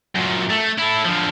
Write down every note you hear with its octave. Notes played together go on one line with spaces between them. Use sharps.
F#2 A#2
A3
E4 A4
D3 F3